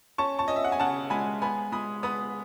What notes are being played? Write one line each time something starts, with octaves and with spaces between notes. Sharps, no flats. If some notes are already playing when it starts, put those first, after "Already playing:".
C#4 A5 C#6
A5 C#6
C#4 D#5
E5
F#5
G#5
C#3 F#5 A5
G#3 G#5 B5
B3 G#5 B5
G#3 B5 D#6
B3 B5 D#6